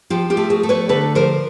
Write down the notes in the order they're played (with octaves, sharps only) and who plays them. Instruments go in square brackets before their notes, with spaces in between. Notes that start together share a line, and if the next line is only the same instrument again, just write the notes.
[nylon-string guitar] F3 F4 G4
F4 G4
A3
F#4 G#4
A3
B4 C#5
D3 A4 B4
F3 A#4 C5